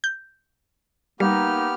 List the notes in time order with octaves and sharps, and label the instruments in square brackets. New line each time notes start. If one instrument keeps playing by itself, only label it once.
[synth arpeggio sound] G6
[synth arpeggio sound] G3 [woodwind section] A#3 D#4 [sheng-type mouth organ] B3 G4 F6